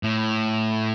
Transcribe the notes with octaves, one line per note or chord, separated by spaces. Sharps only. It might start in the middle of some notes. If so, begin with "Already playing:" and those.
A2